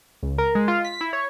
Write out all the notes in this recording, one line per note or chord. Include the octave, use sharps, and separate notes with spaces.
C#2
A#4
G#3
F4
B6
E4
C#5